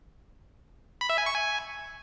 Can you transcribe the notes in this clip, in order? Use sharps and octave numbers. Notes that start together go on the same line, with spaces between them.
B5
E5
G#5
C#6
G#5